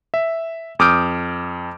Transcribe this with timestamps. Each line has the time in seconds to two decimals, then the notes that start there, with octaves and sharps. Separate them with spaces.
0.14 E5
0.79 F2 D6 D#6 F6 G6 D7